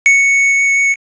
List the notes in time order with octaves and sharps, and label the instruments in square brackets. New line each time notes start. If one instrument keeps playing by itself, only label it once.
[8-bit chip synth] C#7